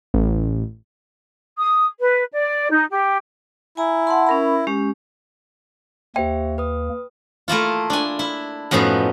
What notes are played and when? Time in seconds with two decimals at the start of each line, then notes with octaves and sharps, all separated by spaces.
0.14 A1
1.58 D#6
2.00 B4
2.33 D5
2.71 D#4
2.91 G4
3.77 E4 G#5 A#5
4.07 F#5 A5 C6
4.27 C#4 A#4 B5
4.67 G#3 C#4 G4
6.16 D#2 A#3 G4 C5 E5 G5
6.58 B4 D#6
7.48 A3 A#3 E4 F4
7.90 D4 G#5
8.19 E4
8.71 F#2 A2 F3 B3 D#4